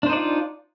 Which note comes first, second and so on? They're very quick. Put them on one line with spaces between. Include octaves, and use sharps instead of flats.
D4 C5 D#4 D5 F4